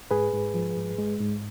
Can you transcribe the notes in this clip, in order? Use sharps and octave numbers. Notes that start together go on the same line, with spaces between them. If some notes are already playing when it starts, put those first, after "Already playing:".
G#2 G#4 B4
G#2
F3
G#2
G#3
G#2